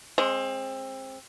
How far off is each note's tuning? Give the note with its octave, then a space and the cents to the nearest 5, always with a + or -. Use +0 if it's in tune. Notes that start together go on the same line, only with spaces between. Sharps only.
G#3 +0 C4 +25